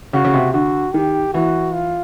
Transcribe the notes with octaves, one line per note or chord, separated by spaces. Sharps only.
C#3 F#4
C#3
C3
D3 F#4
D#3 G4
E3 F#4
F4